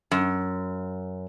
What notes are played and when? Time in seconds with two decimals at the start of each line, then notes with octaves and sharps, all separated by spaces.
0.11 F#2